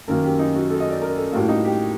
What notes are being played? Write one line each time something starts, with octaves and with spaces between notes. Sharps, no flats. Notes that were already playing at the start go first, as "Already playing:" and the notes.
F#2 D#3 F#3 A#3 A#4
G4
D#4
F#4
A4
D#5
D5
A#4
A4
A2 G3 A#3 F#4
D#4
G4